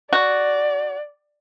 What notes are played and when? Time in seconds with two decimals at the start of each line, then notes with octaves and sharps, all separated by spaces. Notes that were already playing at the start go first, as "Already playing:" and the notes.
0.13 F#4 D5